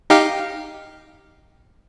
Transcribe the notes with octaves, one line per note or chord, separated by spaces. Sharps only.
D#4 G4 F5